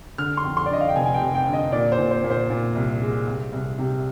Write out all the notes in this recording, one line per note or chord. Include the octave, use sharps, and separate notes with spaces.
D3 F6
C6
F2
C6
D5
D3 D#5
F5
G5
F1 G#5
G#5
G5
F1
G5
D3
D#5
A#2 D5
C5
A#2
C5
A#2
C5
A#2
C2
G#3
C2
C2
C3